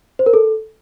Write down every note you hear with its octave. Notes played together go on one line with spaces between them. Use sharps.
C5
A#4
A4